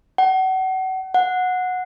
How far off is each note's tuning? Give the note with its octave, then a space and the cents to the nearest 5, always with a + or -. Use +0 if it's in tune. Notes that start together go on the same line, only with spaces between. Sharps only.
F#5 +35
F#5 -15